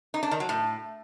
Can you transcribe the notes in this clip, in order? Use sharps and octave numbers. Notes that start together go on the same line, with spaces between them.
D#4
D4
D#3
F#3
A2